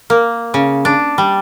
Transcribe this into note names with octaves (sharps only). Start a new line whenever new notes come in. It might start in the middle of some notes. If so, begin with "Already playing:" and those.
A#3
C#3
D4
G3